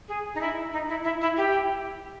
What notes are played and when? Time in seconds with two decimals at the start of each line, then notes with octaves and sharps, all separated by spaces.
0.08 G#4
0.35 D#4
0.41 E4
0.73 D#4
0.89 E4
1.04 E4
1.21 E4
1.37 G4